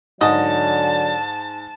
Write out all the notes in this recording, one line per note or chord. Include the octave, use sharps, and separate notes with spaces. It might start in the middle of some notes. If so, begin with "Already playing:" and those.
G#2 D3 F#3 D5 D#5 A5